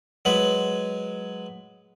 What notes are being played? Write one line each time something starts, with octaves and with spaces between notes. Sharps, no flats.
F#3 G#3 B4